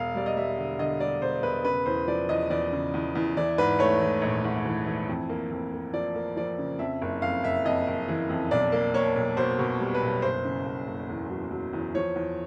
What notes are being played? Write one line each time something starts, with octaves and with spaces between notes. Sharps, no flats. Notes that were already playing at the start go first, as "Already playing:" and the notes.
Already playing: E1 F5
G3 D5
D#5
G3 E5
D3
D3 D#5
G3 D5
E1 C5
E1 B4
C#3 B4
E2 C5
F3 D5
E2 D#5
E2 D5
C#3
E2
E2
E3 D5
G#2 B4
A3 C#5
E3
A#1
G#2
E3
E3
F2
A#3
F2
A#3
F3 D5
A#3
F3 D5
C#3
F2 E5
F#1
F2 F5
F#1 E5
F2 D#5
F#1
E3
F2
B1 D5
A#3
A#3 C#5
B1
B2 C5
B2
G3
B4
B1
F#1 C5
C#3
F#1
F#1
E2
F#3
F#3
E2
F3 C#5
E2